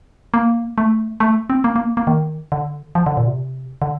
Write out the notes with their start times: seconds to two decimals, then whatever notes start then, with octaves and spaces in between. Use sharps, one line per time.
0.34 A#3
0.78 A3
1.20 A3
1.50 C4
1.64 A#3
1.76 A#3
1.97 A#3
2.07 D#3
2.52 D3
2.95 F3
3.06 D3
3.17 A#2
3.27 C3
3.82 D3